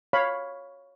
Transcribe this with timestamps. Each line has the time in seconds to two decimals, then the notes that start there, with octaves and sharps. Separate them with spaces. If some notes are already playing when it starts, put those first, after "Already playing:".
0.13 C#5 F5 B5